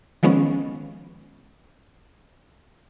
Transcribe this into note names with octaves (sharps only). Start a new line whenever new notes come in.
D#3 F3 G#3 B3 C#4